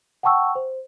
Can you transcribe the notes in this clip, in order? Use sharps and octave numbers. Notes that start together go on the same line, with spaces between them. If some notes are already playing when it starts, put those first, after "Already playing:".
F#5 G5 A5 C#6 E6
C5